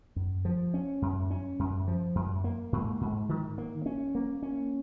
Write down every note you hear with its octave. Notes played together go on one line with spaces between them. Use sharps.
F#2
F3
C#4
F#2
C#4
F#2
F3
F#2
A#3
G#2
G#2
D#3
A#3
C#4
A#3
C#4